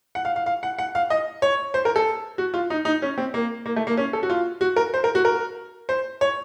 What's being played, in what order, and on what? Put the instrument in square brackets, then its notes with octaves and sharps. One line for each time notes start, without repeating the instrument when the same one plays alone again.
[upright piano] F#5
F5
F5
F5
F#5
F#5
F5
D#5
C#5
C5
A#4
A4
F#4
F4
D#4
D#4
C#4
C4
A#3
A#3
A3
A#3
C#4
A4
F#4
F4
F#4
A#4
C5
A#4
F#4
A#4
C5
C#5